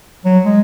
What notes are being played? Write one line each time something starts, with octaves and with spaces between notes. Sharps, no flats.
F#3
G#3